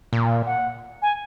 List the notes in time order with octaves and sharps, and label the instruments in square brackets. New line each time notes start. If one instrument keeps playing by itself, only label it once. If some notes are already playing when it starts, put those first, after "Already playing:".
[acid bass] A#2
[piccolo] F#5
G#5